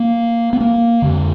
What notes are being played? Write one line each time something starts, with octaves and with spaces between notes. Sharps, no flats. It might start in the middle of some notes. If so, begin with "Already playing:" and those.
Already playing: A#3
B3
A#3
F2 D3